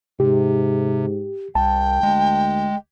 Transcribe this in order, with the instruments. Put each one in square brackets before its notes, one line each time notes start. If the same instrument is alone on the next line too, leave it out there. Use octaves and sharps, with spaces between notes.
[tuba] G#2 [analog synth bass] C3 [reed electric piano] G4
[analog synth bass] C2 [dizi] G5 [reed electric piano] A5
[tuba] D2 [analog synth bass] G#3